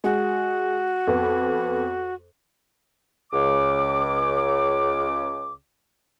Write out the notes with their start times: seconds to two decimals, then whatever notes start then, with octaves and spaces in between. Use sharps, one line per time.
0.04 G#3 F#4
1.07 F2 B3
3.32 C#2 C#3 D6